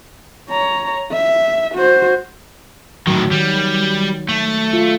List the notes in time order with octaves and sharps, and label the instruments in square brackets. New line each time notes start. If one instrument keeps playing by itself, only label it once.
[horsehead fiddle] C#5 A#5
E5
F#4 C5
[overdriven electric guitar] A2 D#3 [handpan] F#3
[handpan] D#3 [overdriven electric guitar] G3
[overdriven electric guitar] A3
[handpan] F4